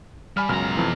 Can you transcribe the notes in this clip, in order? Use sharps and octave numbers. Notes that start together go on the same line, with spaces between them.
G3 G#5 B5 F6
C#2 F#2 B2 A#5 F6
F2 E3